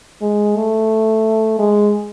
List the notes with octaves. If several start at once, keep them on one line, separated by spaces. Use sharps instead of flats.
G#3
A3
G#3